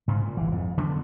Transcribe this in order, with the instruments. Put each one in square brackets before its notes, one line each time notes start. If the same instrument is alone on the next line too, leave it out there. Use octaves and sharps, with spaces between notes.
[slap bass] G#2 C#3 G#3
A#2
G1 E3
F2 G#2
D3 F#3 B3 D4